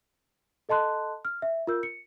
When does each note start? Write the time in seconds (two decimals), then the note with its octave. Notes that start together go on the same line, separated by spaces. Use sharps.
0.69 A4 D#5 A5 C6 F#6
1.25 F6
1.42 E5
1.67 F4 A#4 E6 G6
1.83 C#7